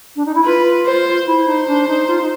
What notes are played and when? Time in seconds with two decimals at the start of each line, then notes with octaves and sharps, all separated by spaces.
0.16 D4
0.26 D#4
0.35 E4
0.45 F4 B4
0.86 C5
1.26 E4 C5
1.46 D#4
1.67 D4
1.88 D#4
2.08 F4
2.21 D#4